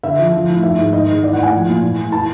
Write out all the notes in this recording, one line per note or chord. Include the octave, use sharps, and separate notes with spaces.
D3 E5
F3
F3
A2
D#3 E5
G#2
D#3 D#5
G#2
E3 D5
A2 F#5
G#5
F3
A#2
E3
A2
E3 A5